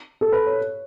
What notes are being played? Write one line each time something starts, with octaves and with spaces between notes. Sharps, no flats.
A4
B4
C#5